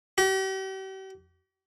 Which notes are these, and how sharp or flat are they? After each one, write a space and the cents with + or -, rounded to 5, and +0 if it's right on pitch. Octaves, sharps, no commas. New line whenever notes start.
G4 -40